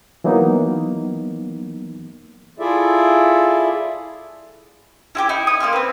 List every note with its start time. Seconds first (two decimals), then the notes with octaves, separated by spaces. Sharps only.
0.24 E3 F#3 A#3 B3 D#4
2.59 E4 F4 G#4 A4 D5 E5
5.15 E4 F#4 G4
5.29 D#4 E4
5.47 D#6
5.60 A#3 C4 C6 F6
5.73 C4 B4